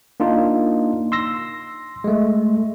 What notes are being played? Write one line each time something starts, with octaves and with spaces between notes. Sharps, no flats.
A#3 D4 D#4 F4
C6 E6 A#6
G#3 A3